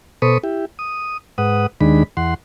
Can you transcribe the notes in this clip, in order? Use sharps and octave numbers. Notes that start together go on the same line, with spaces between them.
B2 A4 C5 B5 C#6 D#6
E4 G4
D#6
G#2 B4 F#5 D#6
D#2 D#3 G#3 D4 B5
E2 F#5 C6